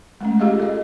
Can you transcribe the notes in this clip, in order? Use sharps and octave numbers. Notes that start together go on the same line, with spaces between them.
G#3 A3 C#4
F4 G4 G#4 D#5 F5
A4 D#5